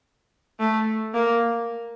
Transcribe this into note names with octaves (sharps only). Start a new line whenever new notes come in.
A3
A#3